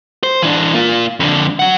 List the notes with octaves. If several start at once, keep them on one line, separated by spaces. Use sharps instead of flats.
C5
E3 D4
A#3 F4
F2 D3
F#3 F#5